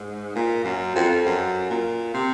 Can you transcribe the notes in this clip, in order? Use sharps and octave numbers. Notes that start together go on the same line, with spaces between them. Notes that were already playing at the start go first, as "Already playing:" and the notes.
Already playing: G#2
A#2
F#2
F2
F#2
A#2
C3